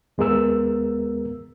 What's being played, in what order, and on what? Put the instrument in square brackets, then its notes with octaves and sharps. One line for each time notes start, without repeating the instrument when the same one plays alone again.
[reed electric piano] D#2 G#3 B3 A#4 E6